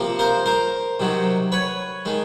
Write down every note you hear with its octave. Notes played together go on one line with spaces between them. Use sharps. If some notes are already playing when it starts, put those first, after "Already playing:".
Already playing: C3 F3 A#3
A#4 C5
A#4 C5
C3 D#3 F#3
B4 C#5
D#3 G#3